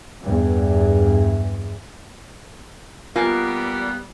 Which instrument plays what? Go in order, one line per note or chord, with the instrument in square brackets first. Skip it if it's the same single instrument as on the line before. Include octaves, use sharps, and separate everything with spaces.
[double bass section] E2 G2
[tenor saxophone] G3 [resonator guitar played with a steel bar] A#3 [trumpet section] B3 [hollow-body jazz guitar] F4 G#5 A5